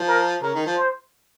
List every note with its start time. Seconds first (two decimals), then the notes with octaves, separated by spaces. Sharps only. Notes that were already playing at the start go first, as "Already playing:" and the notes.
Already playing: F3
0.08 A#4
0.43 C#3 A#4
0.55 D#3
0.66 F3
0.77 C5